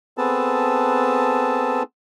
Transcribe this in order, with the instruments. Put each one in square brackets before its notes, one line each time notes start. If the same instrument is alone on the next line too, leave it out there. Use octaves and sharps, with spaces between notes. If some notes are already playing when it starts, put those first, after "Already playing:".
[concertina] B3 C4 G#4 A4 B4 A5